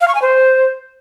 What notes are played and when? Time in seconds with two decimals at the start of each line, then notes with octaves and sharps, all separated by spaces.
0.01 F5
0.08 C#6
0.15 G#5
0.22 C5